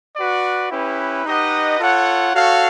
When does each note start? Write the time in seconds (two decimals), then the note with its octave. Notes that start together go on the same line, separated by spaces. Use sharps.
0.17 F#4 B4 D5
0.72 C#4 E4 G4 B4
1.25 D#4 G4 B4 D#5 F#5
1.80 F4 A4 C#5 F#5
2.34 F#4 A4 C#5 F5